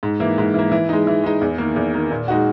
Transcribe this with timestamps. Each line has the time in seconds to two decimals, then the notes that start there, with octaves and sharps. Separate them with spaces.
0.03 G#2
0.20 E3 A#3
0.38 G#2
0.54 E3 A#3
0.72 E3
0.89 G#3 D#4
1.07 E3
1.24 G#3 D#4
1.41 E2
1.58 D#3 A#3
1.76 E2
1.94 D#3 A#3
2.11 A#2
2.28 G#3 D#4 F#4